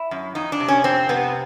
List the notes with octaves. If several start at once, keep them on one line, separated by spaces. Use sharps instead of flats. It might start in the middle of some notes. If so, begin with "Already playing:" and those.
Already playing: E4
F#2
F2 D#4
D4
C3
C#4
F2 C4
C3 B3